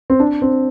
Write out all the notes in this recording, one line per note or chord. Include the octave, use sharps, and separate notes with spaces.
C4
D4
C4